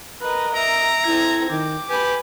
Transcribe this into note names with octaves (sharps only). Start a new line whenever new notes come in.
A#4 B4 D#5
E5 A#5 D7
C4 E4 A4 G#6
D#3 G5 D6
G4 B4 G#5 B5